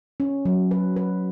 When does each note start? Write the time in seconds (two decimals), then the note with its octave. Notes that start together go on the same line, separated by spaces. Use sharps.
0.20 C#4
0.45 F#3
0.71 B4
0.96 B4